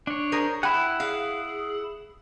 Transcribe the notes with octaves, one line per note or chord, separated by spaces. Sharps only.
D4 C#5
G#4 A#4 C5
E4 G#4 F#5 G5 B5
G#4 F5